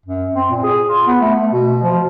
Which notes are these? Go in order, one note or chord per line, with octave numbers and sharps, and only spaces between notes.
F#2
C4
A#2
G#4
F4
B3
A3
A3
B2
F3